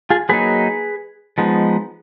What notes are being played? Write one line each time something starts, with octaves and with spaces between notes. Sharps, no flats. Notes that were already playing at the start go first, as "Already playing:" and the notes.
F4 G#4
F#3 A#3 D#4 G#4 B4
F3 G#3 B3 D#4